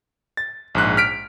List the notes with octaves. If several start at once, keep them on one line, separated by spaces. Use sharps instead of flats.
A6
A#1 G#2 F#6
F6 B6 D7